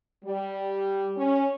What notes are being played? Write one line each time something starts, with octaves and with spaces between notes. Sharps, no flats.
G3
C#4